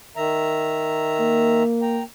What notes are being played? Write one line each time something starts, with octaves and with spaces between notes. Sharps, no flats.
D#3 E5 A#5
A#3
G5 A#5